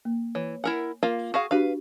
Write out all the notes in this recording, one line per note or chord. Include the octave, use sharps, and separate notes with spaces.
A#3
E3 C#5
E4 A#4 F#5 G#5
A#3 F4 F5
F#4 G#4 F5 C#6
D4 F#4 G4 B4 F5